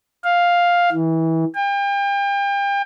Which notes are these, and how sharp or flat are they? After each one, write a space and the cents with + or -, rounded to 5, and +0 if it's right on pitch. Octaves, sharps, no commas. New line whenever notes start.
F5 +5
E3 -25
G5 +35